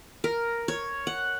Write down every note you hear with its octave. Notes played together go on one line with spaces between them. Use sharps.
A#4
C#5
F#5